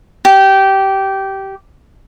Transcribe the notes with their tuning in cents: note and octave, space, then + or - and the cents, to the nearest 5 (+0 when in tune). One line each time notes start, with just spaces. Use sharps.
G4 -15